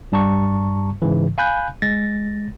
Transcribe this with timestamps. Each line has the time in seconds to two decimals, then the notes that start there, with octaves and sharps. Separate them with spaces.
0.12 G2 G3 A5 A#5 C#6
1.02 G#2 C#3 E3
1.38 F5 G#5 B5 F#6 G6
1.82 G#3 A6 A#6